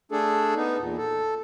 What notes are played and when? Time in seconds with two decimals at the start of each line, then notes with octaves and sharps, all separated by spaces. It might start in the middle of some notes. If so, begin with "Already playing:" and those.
0.12 A3 D4 G#4 A4
0.56 B3 D#4
0.78 E2 A#2
0.98 A4